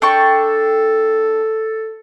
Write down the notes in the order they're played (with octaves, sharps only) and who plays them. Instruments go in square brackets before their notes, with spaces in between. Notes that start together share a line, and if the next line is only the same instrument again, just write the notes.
[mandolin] D4 G5 C#6 [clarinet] A4